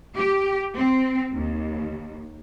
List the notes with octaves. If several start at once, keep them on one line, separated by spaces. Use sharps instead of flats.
G4
C4
D#2